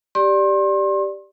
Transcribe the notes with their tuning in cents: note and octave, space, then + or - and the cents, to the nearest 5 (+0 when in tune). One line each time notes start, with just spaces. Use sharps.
G4 +0 D5 +0 C6 +35